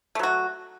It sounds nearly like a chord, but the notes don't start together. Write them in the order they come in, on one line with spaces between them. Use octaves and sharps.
A3 F#3 F#4